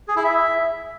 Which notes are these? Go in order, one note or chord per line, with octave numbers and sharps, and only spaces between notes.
G#4
E4
E5